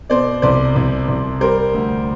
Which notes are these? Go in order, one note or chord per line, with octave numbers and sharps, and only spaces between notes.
B2 C5 D5
C2 C5 D5
C2
C2
G3 A#4 C5
D2